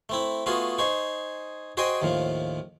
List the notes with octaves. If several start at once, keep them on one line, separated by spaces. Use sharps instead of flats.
A3 C4 E4
A3 B3 F4 F#4 G#4
D#4 G#4 C5 C#6
F#4 G#4 C5 D#5 G5 G#5
D#2 A2 F3